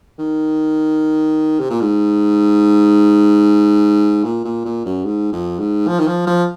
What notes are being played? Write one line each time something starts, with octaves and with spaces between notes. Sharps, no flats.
D#3
C3
A#2
G#2
A#2
A#2
A#2
F#2
G#2
F2
G#2
F3
D#3
F3
F3